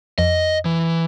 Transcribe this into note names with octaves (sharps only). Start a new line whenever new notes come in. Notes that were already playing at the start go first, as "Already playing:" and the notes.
F2 D#5
E3